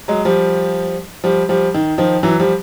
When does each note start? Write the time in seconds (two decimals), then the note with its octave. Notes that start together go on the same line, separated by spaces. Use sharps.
0.08 F#3 G#3
0.25 F3 G3
1.24 F3 G3
1.49 F3 G3
1.74 D#3
1.98 D#3 F3
2.23 E3 F#3
2.40 F3 G3